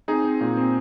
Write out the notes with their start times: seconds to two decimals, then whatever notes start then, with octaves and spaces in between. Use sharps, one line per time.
0.08 C4 D#4 G#4
0.25 C4
0.41 A#2
0.57 C4